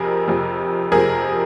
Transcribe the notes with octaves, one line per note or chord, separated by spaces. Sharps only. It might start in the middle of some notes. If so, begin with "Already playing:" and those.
Already playing: F2 C3 F3 G#4 A#4
F2 C3 F3
F2 C3 F3 G#4 A#4